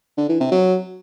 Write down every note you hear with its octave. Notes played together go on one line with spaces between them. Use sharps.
D3
E3
C3
F#3